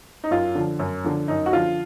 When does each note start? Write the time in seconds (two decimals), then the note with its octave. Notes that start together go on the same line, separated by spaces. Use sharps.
0.24 D#4
0.31 F#2 F4
0.55 D3 F3
0.79 F#2
1.04 D3 F3
1.28 F#2 D#4
1.46 F#4
1.53 D3 F3 F4